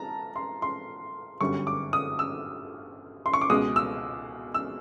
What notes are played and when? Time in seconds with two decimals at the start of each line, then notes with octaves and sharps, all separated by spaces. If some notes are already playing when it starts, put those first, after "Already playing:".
Already playing: A5 A#5
0.36 C6
0.62 C6
1.41 G1 F#2 D3 G3 C#6
1.67 D6
1.93 D#6
2.19 E6
3.26 C6
3.34 C#6
3.41 D6
3.50 C#2 B2 G#3 D#6
3.76 E6
4.54 E6